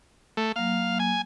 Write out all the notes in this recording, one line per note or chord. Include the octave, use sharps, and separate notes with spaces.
A3
F#3 A#3 F5
G#5